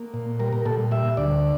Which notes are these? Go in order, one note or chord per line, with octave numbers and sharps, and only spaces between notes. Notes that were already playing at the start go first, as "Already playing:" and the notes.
Already playing: A#3
A#2
G3 A#4
A#4
A#2 A4
G3 E5
D2 D5